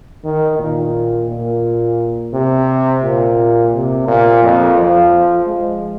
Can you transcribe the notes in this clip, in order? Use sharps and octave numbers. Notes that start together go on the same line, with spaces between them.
D#3
A#2
A#2
C3
A#2
C3
A#2
F2
F3
G#3